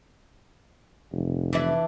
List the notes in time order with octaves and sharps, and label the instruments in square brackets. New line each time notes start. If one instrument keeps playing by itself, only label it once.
[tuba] F1
[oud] E3 D4 E5